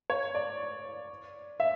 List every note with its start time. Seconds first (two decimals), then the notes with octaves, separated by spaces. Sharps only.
0.10 C#5
0.35 D5
1.60 E5